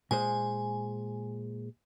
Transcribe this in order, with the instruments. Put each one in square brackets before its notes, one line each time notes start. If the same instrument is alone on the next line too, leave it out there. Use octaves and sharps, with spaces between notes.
[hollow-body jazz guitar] A#2 G#3 C5 [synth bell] G#5